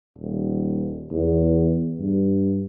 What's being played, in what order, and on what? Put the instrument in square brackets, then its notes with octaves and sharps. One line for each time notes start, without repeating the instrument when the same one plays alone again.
[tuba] D#1
E2
G2